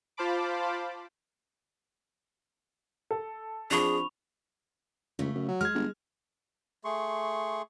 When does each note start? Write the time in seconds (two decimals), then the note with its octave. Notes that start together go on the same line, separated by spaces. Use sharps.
0.17 F4 C5 F5 A5 B5 D6
3.11 A4
3.71 F3 C4 D4 G#4 B5 C#6 F7
5.19 C#2 C#3 A3
5.35 F#2
5.48 F#3
5.61 G#3 F6 G#6
5.74 G1
6.84 A3 G#4 C6 C#6